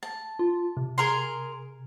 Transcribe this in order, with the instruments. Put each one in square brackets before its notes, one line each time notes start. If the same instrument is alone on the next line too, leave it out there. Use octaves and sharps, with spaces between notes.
[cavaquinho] A5
[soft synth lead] F4
C3
[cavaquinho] G#4 A#4 C6